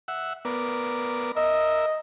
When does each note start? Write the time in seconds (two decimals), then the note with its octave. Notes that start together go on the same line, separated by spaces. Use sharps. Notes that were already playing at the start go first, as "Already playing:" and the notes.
0.08 E5 F#5
0.45 B3 A#4 D5
1.36 A#4 D#5 E5